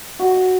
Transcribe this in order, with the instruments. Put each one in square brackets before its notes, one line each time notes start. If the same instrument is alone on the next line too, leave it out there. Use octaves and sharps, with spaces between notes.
[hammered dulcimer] F#4